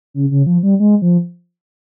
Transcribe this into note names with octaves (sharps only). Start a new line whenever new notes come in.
C#3
C#3
F3
G3
G#3
F3